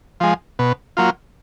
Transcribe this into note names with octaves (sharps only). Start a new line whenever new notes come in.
F3 G#3
B2
F#3 A#3 F4